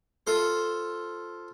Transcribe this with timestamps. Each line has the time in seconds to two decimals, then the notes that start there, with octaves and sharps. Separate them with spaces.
0.27 F4 A4 C5